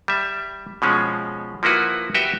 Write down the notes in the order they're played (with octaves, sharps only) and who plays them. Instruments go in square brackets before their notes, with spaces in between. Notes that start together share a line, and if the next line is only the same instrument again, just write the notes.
[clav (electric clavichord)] G3 E5
B2 F3 G#3 C#4
F3 A#3 E4 F#4 B4
F#4 G4 B4 E5 G5